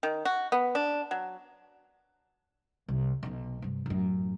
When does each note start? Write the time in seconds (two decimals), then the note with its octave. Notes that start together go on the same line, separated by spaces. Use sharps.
0.03 D#3
0.25 F#4
0.52 B3
0.75 D4
1.11 F#3
2.88 C2
3.23 B1 B2
3.62 G2 C3
3.86 A1 F#2